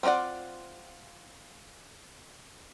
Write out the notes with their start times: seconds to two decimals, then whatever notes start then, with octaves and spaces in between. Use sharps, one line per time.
0.03 C4 F4 F#4 D5 F#5